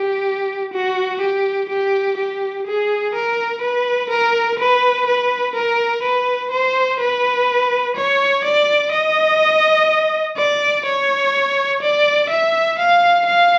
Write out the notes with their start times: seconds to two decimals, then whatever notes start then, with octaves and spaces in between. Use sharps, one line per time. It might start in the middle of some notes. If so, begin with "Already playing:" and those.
Already playing: G4
0.73 F#4
1.22 G4
1.70 G4
2.17 G4
2.67 G#4
3.15 A#4
3.62 B4
4.10 A#4
4.59 B4
5.07 B4
5.55 A#4
6.03 B4
6.52 C5
7.00 B4
7.96 C#5
8.44 D5
8.93 D#5
10.37 D5
10.86 C#5
11.82 D5
12.30 E5
12.79 F5
13.27 F5